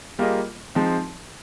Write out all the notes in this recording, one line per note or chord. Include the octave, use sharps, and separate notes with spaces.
G3 A#3 F4 G#4 D#5
F3 G#3 C4 D#4